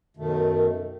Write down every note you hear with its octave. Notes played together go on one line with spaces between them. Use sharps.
F#2 B2 D#3 A3